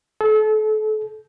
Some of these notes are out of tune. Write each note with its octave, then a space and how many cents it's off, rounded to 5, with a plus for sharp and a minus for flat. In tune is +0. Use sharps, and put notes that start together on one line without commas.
A4 -35